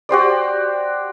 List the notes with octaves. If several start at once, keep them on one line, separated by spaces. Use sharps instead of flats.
F#4 G4 C5 D5